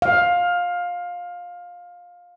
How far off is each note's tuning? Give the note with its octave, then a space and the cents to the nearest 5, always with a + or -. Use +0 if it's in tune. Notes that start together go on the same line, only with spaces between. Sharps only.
F5 +20